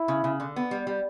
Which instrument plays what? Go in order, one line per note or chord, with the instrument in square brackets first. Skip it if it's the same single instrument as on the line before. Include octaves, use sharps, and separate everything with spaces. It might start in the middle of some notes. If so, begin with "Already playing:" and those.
Already playing: [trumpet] E4
[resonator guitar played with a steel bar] C#3
C#3
D3
B3
G3
G3